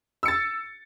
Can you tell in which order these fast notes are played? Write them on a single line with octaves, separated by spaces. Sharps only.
E6 C#7 A6